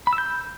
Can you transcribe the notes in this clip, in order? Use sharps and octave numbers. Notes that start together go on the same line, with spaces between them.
B5
E6
G6